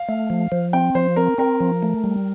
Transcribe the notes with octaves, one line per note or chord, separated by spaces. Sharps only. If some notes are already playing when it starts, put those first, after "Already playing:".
Already playing: F5
A3
F3
F3
C4 G5
F3 C5
C4 A#4
C4 A#4
F3
A3
G3